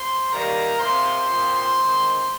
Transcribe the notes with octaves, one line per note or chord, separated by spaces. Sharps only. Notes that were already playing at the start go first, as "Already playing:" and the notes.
Already playing: C5 C6
D#3 G3 A#3 A#4 A#5
C3 F3 A#3 C5 C6
A#2 F3 C4
D#3 G#3 C4